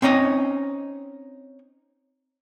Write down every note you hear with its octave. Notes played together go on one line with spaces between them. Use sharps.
C4 C#4 D#4 D#5